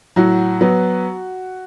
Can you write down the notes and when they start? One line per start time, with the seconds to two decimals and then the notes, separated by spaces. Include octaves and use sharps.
0.16 A2 F#3 F#4
0.61 F#3 B3